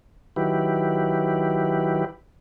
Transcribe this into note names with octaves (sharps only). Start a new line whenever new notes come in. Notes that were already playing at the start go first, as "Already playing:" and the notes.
D#3 F#3 E4 G4 B4